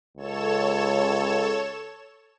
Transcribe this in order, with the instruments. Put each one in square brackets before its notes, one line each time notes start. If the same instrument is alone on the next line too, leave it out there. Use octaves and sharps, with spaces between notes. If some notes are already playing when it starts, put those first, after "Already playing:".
[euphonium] C#2 [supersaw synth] A4 C#5 E7